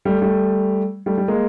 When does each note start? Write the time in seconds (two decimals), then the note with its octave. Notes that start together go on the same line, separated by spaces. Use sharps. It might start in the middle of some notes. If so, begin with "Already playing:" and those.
0.05 G3 A3
0.22 G3 A3
1.06 G3 A3
1.18 G3
1.28 G#3 A#3